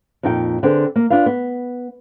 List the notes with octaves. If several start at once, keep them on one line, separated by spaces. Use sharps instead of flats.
F2 A#2 D#4 G5
D3 C4 G#4 B4 G5
A#3
D4 F4 B4 F5
B3